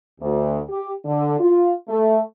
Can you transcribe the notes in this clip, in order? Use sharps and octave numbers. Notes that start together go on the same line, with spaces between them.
D2
G4
D3
F4
A3